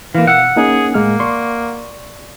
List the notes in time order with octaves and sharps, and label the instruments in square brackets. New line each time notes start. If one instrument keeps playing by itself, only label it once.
[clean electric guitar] E3 A#3 [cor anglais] F5
[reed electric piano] B2 E6 F6 [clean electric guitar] F#5
[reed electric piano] A#3 C#4 D#4 [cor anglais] G#4
[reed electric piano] A2 G#3 F6 [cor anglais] A#3
[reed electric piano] D5 C6 C#6